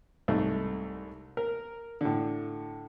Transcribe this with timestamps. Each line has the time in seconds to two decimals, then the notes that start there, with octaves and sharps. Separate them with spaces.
0.28 C2 G#2 A3 D#4
1.37 A#4
2.01 A2 D3